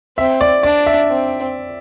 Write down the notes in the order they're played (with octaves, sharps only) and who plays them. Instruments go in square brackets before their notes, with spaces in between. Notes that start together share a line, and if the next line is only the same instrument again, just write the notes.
[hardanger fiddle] C4 [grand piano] E5
[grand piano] D5
[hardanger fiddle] D4 [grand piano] D5
[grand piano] E5
[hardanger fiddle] C4